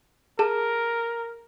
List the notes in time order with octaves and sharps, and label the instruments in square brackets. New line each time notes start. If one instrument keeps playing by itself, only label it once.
[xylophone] G#4 A5 [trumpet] A#4